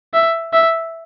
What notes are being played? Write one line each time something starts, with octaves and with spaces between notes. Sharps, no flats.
E5
E5